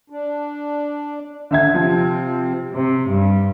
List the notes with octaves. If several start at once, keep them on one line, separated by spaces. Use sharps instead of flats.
D4
D3 E5 G#6
C3 F3 C4
C3
G2